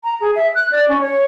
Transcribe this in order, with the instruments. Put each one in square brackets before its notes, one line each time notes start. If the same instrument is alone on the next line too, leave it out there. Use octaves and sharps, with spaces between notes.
[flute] A#5
G#4
E5
F#6
D5
C#4
C#5